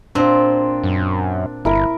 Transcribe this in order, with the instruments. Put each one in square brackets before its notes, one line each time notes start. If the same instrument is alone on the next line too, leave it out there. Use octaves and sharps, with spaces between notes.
[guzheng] A#2 C4 [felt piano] D4 C5
[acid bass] F#2
[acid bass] G1 [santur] E4 A#4